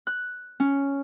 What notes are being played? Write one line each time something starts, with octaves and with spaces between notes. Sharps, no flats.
F#6
C#4